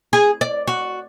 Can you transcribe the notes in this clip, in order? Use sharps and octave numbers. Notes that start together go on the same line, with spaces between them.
G#4
D5
F#4